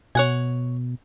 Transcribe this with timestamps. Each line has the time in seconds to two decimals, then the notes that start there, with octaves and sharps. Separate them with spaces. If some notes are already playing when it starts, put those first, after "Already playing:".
0.15 B2 C#5 F#5 G#5